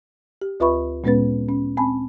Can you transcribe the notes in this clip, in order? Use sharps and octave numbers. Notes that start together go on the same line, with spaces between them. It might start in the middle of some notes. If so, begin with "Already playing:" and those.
G4
D2 F4 B4 E5 B5 C#6
A#2 G#3 B3 C#4 B4 A6
C#4
C4 G#5 A5 B5